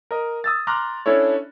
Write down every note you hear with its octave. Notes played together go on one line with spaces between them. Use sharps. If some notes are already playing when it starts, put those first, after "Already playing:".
A#4 D#5
D#6 E6 A6
A#5 C6 D6 F6 F#6 A#6
C#4 D4 E4 A4 C#5